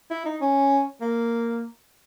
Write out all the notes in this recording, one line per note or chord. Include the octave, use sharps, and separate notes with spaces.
E4
D#4
C#4
A#3